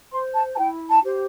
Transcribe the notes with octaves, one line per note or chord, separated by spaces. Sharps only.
C5 C6
A5
A5
E4 G5
A5
G4 C5